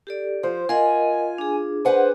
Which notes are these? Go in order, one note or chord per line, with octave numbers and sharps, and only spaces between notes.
G4 A4 D5
F3 C5
F4 A#4 D#5 F#5 G#5
D4 G#4
B4 C5 F#5 G#5